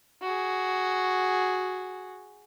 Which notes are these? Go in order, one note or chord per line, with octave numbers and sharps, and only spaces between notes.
F#4 G#4